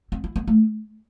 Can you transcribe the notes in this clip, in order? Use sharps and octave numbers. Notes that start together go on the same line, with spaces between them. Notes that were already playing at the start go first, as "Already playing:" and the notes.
C4
E4
B3
A3